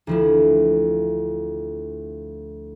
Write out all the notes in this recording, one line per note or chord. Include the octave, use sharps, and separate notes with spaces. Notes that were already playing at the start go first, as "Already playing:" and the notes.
D2 F3 E4